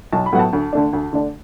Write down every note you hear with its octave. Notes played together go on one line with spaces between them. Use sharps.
B1 A5
B5
A2 F#3 B3 F#5
A5
D2
D3 A3 D4
D2
D3 A3 D4